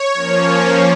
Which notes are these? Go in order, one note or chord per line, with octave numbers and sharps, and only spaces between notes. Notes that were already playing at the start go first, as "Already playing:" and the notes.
Already playing: C#5
F3 A#3 C#4